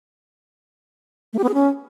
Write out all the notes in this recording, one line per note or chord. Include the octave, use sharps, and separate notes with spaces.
A3
G4
B3
G#4
C#4